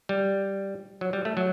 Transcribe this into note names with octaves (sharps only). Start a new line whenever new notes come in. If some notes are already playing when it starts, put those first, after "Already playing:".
G3
F#3
G3
A3
F#3